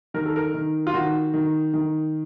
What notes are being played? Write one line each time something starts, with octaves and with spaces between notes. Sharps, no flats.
D#3 A#4
A4
A#4
D#3
F4
D#3 F#4
D#3
D#3